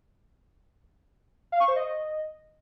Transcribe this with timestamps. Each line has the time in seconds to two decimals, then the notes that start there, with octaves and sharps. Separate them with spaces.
1.52 F5
1.60 C#6
1.68 C5
1.76 D#5